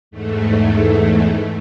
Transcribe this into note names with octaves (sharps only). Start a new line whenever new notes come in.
E2 G#2 A3